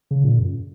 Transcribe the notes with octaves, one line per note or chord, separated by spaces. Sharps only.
C#3
A#2
F#2